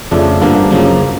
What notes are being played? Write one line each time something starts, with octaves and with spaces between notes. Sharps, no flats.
F2 C#3 F3 A3 D4
G2 D3 F3 A#3 D4
F#2 C#3 F3 A#3